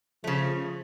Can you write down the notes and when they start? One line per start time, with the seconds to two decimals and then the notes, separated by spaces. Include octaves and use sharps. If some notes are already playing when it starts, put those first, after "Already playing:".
0.24 C#3 F3 A3